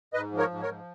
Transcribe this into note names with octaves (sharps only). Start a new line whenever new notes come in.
G#2 B4 D#5
F3
A#4 C#5
G#2
A#4 C#5
F3